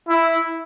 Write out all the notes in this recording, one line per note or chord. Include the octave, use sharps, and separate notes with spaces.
E4